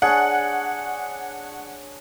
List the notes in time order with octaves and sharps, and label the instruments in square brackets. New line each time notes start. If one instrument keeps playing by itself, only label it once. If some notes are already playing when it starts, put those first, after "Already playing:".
[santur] D4 G#4 C#5 [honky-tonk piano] F#5